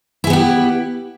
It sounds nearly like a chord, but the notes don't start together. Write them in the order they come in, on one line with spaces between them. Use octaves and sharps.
E4 G#4 B3 G4